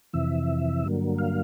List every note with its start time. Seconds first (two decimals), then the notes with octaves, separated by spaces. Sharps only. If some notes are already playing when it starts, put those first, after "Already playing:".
0.13 F2 C3 E3 E5
0.84 G2 D3 F#3 A#3
1.18 F5